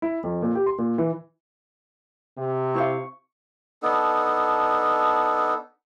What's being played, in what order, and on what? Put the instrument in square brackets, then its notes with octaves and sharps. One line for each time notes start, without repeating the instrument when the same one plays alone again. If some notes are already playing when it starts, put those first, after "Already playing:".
[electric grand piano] E4
F2
A#2
G4
C6
A#2
E3
[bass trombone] C3
[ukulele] E4 C5 F5 [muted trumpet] C#6
[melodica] B3 D4 D#4 A4